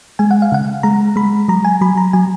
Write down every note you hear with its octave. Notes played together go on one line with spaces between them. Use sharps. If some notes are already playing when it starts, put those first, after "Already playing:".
G#3 G#5
F#5
F5
C#3 F#5
G#3 A#5
G#3 B5
F#3 A#5
G#5
F#3 B5
A#5
F#3 G#5